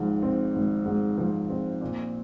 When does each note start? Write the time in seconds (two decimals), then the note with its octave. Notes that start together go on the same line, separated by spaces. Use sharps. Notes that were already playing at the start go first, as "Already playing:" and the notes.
Already playing: G#1 G#2 F3
0.22 C4
0.54 G#1
0.86 G#2
1.18 F3
1.50 C4
1.81 A#2